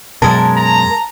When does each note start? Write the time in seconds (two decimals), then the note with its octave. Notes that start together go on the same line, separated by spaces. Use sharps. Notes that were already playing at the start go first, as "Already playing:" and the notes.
0.22 F#2 B2 G#3 A#4 A5
0.56 A#5